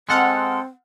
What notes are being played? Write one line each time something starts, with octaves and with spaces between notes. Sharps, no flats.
G#3 C4 A4 F#5 F6